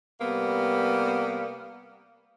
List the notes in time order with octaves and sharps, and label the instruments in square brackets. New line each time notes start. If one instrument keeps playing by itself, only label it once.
[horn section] C3 G3 A#3 B3